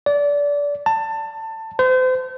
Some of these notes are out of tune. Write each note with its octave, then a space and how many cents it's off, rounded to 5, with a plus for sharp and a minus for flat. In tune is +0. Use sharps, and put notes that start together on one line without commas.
D5 -25
A5 +20
C5 -35